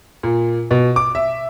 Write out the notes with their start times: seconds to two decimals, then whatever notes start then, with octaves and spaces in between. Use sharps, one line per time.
0.23 A#2
0.71 B2
0.96 D6
1.15 E5